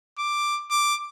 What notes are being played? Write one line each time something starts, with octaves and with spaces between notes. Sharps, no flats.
D6
D6